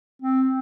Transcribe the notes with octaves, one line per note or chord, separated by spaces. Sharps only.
C4